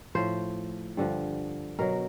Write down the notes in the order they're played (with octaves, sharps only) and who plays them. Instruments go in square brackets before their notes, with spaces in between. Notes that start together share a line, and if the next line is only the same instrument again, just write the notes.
[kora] A2 F3 C5
G2 D3 F3
B2 F#3 A#4